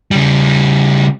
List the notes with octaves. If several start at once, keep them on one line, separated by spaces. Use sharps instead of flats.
C#3 G3